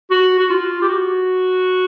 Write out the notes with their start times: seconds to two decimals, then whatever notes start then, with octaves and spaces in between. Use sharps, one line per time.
0.11 F#4
0.39 F#4
0.50 F4
0.82 G4
0.89 F#4